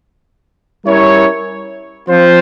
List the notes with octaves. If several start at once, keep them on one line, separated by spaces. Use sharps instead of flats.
G3 C#4 E4 A#4 C#5
F3 C4 F4 C5